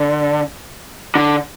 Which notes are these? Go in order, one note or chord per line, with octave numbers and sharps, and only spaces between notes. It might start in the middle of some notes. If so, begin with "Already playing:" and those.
Already playing: D3
D3